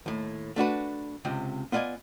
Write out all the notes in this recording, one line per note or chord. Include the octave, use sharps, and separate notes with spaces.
D#2 A2
A3 D4 F#4 B4
C#2 C3 C4
B3 F4 D5 D#5 G#5